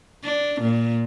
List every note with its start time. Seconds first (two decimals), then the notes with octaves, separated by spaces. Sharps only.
0.24 D4
0.61 A#2